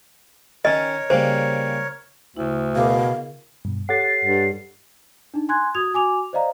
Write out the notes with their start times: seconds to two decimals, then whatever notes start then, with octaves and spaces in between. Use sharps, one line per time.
0.65 D#3 C#4 A#4 C#5 D#5
1.10 C#3 G3 A#3 C5
2.37 D2 C#3 E4
2.75 B2 G#4 A#4 F5 D6
3.65 G2 B2
3.89 G4 A4 C#5 F#5 A6 C7
4.25 G2
5.34 D4 D#4
5.49 G#5 C6 F#6 G#6
5.75 F#4 D#6 G#6 F7
5.94 F#4 G#5 D6 F7
6.33 C5 D5 D#5 F5 A#5